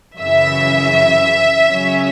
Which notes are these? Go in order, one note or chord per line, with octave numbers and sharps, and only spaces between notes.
F#2 C#3 E3 E5
C#3 F#3 C#4